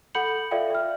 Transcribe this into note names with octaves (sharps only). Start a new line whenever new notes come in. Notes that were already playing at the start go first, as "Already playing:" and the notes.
A4 F#5 B5 G6 C#7 F#7
F4 A4 D5 E5 F5 G5
E5 F6